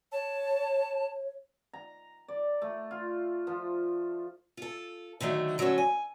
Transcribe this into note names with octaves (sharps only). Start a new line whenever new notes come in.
C#5 A5
A#5
D5
A3
F4
F3
F4 A4
D3 D#3 F#3 A3
D3 F#3 A3 C#4 A4 C#5
G#5